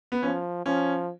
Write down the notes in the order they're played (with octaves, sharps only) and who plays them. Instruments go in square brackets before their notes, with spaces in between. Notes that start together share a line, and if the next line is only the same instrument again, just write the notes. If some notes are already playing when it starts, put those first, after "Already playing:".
[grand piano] B3
[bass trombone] F3 [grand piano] C#4
[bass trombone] F3 [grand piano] C#4